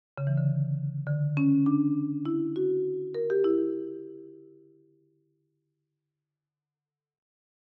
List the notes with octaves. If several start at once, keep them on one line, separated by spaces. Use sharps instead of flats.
C#3
E3
D3
D3
C#4
D4
E4
F#4
A#4
G4
E4